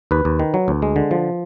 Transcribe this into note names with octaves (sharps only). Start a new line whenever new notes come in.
D#2 B4
D#2
D#3
F#3
D2
G#3
D3
F3